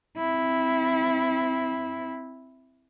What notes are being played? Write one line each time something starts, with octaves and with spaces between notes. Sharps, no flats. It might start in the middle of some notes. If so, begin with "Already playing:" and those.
C4 E4